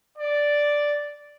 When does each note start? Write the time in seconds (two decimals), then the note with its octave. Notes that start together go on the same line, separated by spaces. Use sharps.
0.17 D5